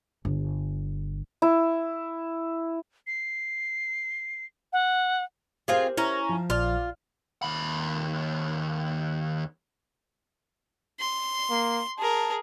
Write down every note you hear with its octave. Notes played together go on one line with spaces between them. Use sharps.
G1
E4
C7
F#5
C4 F4 G4 G#4 A#4 C5
C#4 E4 A#5
F3
A#1 F4 D5 F6
D#2 B5
C6
A#3
G#4 A#4 A5